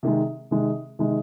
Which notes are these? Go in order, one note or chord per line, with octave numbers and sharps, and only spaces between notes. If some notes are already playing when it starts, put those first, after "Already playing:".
C3 D#3 G#3
C3 D#3 G#3
C3 D#3 G#3